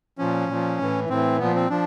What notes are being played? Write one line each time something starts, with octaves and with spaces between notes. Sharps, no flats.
A#2 F3 C#4
A#2 F3
A2 E3
A2 E3 C4
A#2 F3 B3
C4
F3 D4